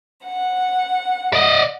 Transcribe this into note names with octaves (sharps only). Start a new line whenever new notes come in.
F#5
D5 D#5